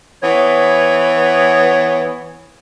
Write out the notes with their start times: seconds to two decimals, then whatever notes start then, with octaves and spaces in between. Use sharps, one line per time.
0.22 E3 B3 C#5